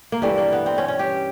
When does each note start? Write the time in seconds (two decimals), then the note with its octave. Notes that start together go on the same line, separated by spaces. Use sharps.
0.12 A#3
0.22 G2 E3 G3 A3
0.38 A#3
0.52 B3
0.66 C4
0.78 C#4
0.88 C#4
0.99 G4